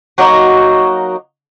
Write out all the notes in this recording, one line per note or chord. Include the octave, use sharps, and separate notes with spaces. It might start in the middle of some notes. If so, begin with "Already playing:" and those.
F#3 A#3 D#4 F#4